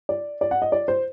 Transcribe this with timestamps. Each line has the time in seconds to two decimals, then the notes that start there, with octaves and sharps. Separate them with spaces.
0.09 D5
0.41 D5
0.51 F#5
0.62 D#5
0.72 D5
0.88 C5